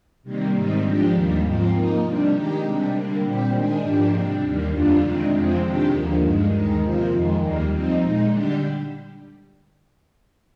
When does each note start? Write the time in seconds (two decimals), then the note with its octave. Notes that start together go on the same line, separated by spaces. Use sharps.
0.23 C3 D#3 G3 A#3
0.53 G#2 D#3 G3 C4 D#4
0.83 F3 G#3 D4 G4
1.13 D#2 D#3 G3 A#3
1.42 G#2 F3 C4 F4
1.72 F3 A#3 D#4
2.03 C3 G3 D4
2.32 D#3 G#3 D#4 G4
2.62 C3 G3 D4
2.91 D3 G3 A#3
3.22 A#2 G3 C4 G4
3.51 D#3 G#3 D4 G#4
3.81 G#2 F3 A#3 D4 G4
4.11 C3 G3 D4
4.41 D#2 D#3 G3 A#3
4.71 F2 D3 G3 D4 F4
5.01 C3 D#3 G#3 D4
5.31 F2 C3 F3 G#3 C4
5.60 C3 D#3 G#3 D4 G4
5.90 D#2 D3 F3 A#3
6.20 G2 D#3 G#3
6.50 D#2 D#3 G#3 D#4
6.80 C3 F3 A#3 F4
7.10 F2 D#3 G#3
7.40 D#2 D#3 G3 A#3
7.70 F3 C4 D#4
7.99 A#2 G#3 D#4
8.29 D3 G3 D4 G4